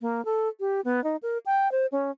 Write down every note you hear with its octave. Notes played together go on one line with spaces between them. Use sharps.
A#3
A4
G4
B3
D#4
A#4
G5
C5
C#4